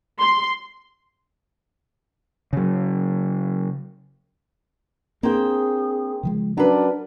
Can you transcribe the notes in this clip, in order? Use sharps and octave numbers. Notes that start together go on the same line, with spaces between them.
C6
C#3 F#3
A#3 C4 D4 G#4 C5 G5
C#3 F3 G#3
F#3 C#4 D4 A#4 B4